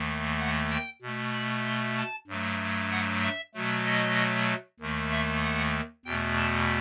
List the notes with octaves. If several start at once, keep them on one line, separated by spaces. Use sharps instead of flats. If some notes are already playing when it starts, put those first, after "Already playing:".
Already playing: D#2 D#3 A3
F#5
G5
B2 A3
B5
C6
A5
G2 F#3 A3
F#5
E5
B2 F#3 A3
D#5
D#2 D#3 A3
E5
F#5
E2 B2 A3 G5
A5